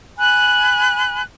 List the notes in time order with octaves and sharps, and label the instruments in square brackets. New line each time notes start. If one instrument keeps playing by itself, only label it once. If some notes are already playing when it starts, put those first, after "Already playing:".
[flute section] G#5 B5 F#6